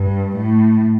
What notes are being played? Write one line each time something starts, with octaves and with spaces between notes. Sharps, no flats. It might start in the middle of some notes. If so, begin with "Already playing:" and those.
Already playing: G2
A2